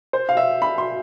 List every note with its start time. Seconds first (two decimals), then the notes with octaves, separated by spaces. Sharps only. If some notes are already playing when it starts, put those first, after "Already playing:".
0.13 C5
0.29 F5
0.37 E5
0.62 B5
0.78 C6